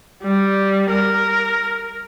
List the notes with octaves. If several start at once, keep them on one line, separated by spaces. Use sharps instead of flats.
G3
A#4